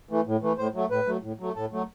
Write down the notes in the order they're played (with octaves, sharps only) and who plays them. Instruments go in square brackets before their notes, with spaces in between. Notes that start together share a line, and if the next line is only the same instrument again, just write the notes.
[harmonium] E3 A3
A2
E3 A3
A2 C5
F#3 A3
A2 B4
F#3 A3
A2
F#3 A3
A2 A4
F#3 A3